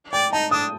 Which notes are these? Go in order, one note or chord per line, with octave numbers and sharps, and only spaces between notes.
D5 G5
D#4 A5
D4 D#6